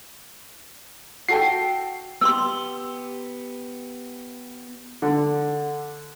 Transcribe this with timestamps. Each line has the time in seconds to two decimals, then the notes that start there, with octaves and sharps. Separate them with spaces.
1.29 F#4 A4 G5 C7
2.21 B3 G4 C6 D#6 E6
5.02 D3